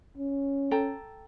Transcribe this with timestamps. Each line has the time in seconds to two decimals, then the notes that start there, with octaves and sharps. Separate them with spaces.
0.17 C#4
0.71 A4 G5 A#5